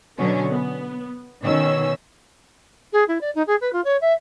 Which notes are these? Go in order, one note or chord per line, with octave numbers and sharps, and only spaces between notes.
B2 D3 F#3 B3 C#4
B3
B2 D#3 C#4 E6
G#4
E4
D5
D#4
G#4
B4
F4
C#5
E5